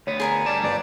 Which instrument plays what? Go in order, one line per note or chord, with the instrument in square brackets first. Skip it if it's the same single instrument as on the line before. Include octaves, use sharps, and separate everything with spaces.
[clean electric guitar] D2 B3 [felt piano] C#5
[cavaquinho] G#4 A#4 G#5
[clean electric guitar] G2 G3 A5 [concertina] D5
[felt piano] G1 B4 [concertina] D5